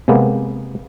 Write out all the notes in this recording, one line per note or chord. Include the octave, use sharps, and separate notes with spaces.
C3 G#3 A#3 B3